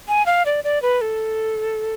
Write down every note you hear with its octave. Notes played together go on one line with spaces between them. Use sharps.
G#5
F5
D5
D5
B4
A4